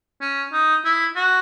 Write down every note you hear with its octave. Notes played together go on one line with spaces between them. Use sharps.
C#4
D#4
E4
F#4